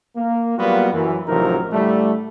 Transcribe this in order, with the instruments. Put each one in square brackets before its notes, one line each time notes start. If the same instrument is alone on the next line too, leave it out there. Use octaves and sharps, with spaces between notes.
[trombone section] A#3
F#3 G3 A#3 B3 F4 F#4
F#2 E3
A1 C3 F3 F#3 D#4 A#4
A2 D3 G3 A3